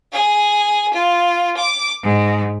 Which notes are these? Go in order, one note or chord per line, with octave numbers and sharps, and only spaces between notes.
G#4
F4
D6
G#2